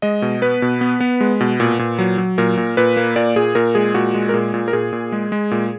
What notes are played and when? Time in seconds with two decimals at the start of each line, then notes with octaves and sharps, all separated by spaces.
0.02 G#3 D#5
0.22 B2
0.42 B3 B4
0.62 B2
0.81 B3
1.00 B3
1.21 G#3
1.40 B2
1.60 A#2
1.79 A#2
1.99 F#3
2.18 F#3
2.38 A#2 A#4
2.57 A#2
2.77 A#2 B4
2.97 A#3
3.16 A#2 D5
3.36 A#2 G#4
3.55 A#2 A#4
3.75 G#3 G#4
3.94 A#2 F#4
4.14 G#3
4.29 A#4
4.34 A#2 G#4
4.54 A#2
4.68 A#4
4.73 A#2 G#4
4.93 A#2
5.12 G#3
5.32 G#3
5.51 A#2